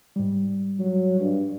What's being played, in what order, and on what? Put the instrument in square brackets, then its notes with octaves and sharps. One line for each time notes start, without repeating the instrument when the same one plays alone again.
[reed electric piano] G#2 G3
[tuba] F#3
G2